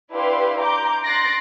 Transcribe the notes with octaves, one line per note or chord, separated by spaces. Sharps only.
D4 E4 G4 B4 F5 C6
A#5 C6 D6 G6
C6 F#6 A6 A#6 C7 D7